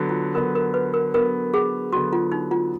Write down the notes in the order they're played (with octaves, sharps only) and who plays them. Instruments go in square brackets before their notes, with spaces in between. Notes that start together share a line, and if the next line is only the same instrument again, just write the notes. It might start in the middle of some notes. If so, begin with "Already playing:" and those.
Already playing: [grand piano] D3 F#3 B3
[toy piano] F4
[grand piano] D3 F#3 B3 [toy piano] A#4
[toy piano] A#4
B4
A#4
[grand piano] D3 F#3 B3 [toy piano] A#4
[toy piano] G#4
[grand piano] D3 F#3 B3 [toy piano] F#4
[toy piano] F4
D#4
F4